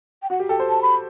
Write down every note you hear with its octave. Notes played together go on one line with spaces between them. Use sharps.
G5
F#4 F#5
G4
A4 G5
C5
A5
B5